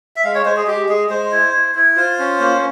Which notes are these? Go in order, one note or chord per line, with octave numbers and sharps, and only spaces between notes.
E5
G#3 F5
C#5
G#3 C5
G#4
G#3 G4
G#3 G#4
G#3 C5
E4
E4
E4
F4 C5
C#4
A#3